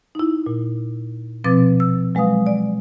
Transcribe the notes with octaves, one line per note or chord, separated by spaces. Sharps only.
D#4 E4
A#2
B2 F3 C4 B4 D6 A6
E6
F#3 G#3 B4 F5 D#6
D5 G#5